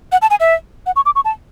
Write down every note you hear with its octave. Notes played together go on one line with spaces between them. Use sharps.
F#5
A5
G#5
E5
F#5
C#6
D6
C#6
A5